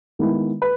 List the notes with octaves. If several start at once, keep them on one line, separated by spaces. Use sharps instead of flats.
D#3 G#3 B3 E4
B4